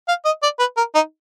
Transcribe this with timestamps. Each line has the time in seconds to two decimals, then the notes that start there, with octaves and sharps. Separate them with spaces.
0.08 F5
0.25 D#5
0.43 D5
0.59 B4
0.77 A#4
0.95 D#4